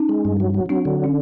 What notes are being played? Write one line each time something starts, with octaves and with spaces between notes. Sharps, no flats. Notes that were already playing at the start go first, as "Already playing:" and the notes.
Already playing: C#4 D#4
G#3
G2
F#3
F#3
F#3 C4 D4
D3
C#4